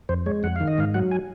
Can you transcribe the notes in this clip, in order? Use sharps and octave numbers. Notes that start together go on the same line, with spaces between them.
F2 C5
G#3 C#5
F2 F#5
D#3 F5
D#5
G#2 F5
F#3 F#5
G#5